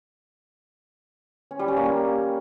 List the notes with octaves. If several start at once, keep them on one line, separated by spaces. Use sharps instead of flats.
C#4
G3
C#4
A#3
G3